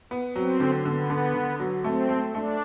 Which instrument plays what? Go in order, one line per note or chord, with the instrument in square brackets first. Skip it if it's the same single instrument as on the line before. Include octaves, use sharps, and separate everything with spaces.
[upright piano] B3
[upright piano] F#3 [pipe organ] C4
[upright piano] D3
[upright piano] D3 [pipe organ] B3
[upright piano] D3
D3
F#3
[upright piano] A3 [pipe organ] C4
[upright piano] A3
[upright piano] A3 [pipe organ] D4